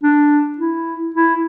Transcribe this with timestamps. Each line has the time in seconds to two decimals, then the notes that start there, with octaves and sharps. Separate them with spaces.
0.03 D4
0.58 E4
1.14 E4